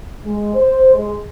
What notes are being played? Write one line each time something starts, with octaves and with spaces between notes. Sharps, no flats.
G#3
C5
G#3